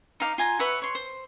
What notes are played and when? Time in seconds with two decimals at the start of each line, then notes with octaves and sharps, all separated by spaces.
0.20 D#4 F5 D6
0.38 F4 G#5 A#5
0.59 B4 C#5 E5 F#5
0.82 C#5 C6
0.95 C5